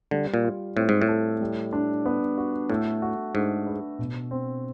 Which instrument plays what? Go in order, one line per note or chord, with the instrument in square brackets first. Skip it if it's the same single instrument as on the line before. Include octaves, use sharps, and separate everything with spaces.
[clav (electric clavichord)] D3 [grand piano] G3
[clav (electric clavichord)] A#2
[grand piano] F4
[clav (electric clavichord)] A2 [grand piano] C4
[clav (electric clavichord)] G#2
A2
[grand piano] A4
G3
D4
B3
F#4
[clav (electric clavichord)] A2 [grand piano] A3
[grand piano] F#4
[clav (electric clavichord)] G#2 [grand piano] D4
[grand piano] B4
B2
C4